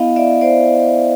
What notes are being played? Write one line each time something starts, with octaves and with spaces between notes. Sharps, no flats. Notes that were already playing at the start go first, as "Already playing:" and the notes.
Already playing: B3 E4 D#5 F5
D5 E5
C5 D5